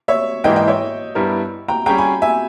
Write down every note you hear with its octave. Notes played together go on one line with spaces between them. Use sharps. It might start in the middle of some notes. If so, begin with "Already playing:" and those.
C#5 E5
G#2 E3 A#3 E4 D#5 G5
D#5 G5
C#5 E5
G2 G3 B3 E4 A#4
G5 A#5
G3 C#4 G#4 G5 A#5
G#5 B5
E5 G#5